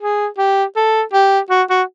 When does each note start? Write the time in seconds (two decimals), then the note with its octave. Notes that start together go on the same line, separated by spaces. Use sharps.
0.01 G#4
0.38 G4
0.76 A4
1.13 G4
1.50 F#4
1.70 F#4